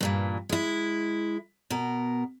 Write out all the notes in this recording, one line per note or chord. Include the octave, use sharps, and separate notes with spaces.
G2 A#2 E3
G#3 E4
B2 A#4